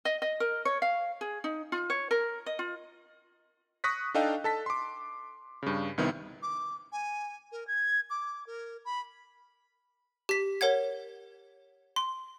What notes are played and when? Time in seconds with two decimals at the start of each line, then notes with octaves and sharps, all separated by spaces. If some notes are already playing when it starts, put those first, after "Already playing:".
0.05 D#5
0.22 D#5
0.40 A#4
0.65 C#5
0.82 F5
1.21 G#4
1.44 D#4
1.72 F4
1.90 C#5
2.11 A#4
2.46 D#5
2.59 F4
3.84 C#6 D#6 F#6 A#6 B6
4.14 D4 D#4 A4 D#5 F5 G5
4.44 A4 A5 B6
4.66 C6 D6
5.63 G2 C#3
5.98 C2 D#3 B3 C4 E4
6.42 D6
6.92 G#5
7.52 A#4
7.68 G#6
8.10 D6
8.47 A#4
8.85 B5
10.29 G4 B6
10.61 A#4 C#5 F#5 G#6
11.96 C6